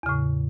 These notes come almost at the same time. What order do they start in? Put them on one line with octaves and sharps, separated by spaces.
E2 C#3 A2